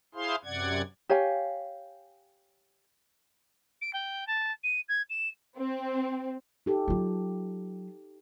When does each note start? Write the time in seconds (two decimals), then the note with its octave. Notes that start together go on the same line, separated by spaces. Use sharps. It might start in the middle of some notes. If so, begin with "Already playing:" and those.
0.15 E4 G#4 C5 F5 C6
0.44 F#2 C3 D5 F#5 G#6
1.09 G4 C#5 F5 G#5
3.81 D7
3.93 G5
4.27 A5
4.63 D#7
4.88 G#6
5.09 E7
5.57 C4
6.66 D#4 G4 A4
6.88 F#3 F4